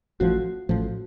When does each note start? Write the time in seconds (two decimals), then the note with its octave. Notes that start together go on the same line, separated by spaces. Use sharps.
0.20 A1 A2 F3 F#4
0.69 A1 A2 F3